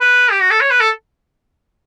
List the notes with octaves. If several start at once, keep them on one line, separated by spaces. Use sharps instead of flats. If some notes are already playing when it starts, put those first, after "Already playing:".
B4
G4
F#4
A4
C#5
B4
A4